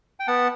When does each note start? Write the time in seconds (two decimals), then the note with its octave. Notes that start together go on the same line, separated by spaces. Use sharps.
0.20 G5
0.27 B3 F#5 A5